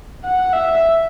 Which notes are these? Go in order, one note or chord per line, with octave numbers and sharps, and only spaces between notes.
F#5
E5